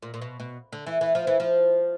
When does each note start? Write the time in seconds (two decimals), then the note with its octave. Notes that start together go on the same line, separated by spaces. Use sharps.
0.02 A#2
0.14 A#2
0.22 B2
0.40 B2
0.73 D3
0.86 E3
1.01 E3
1.15 F3
1.27 E3
1.40 F3